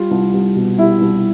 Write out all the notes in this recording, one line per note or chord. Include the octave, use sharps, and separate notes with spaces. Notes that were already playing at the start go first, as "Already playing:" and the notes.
Already playing: G3 F4
C2
C2
B2
G3 E4
C2